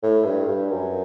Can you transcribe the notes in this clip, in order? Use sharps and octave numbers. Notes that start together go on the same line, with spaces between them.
A2
G2
G2
F#2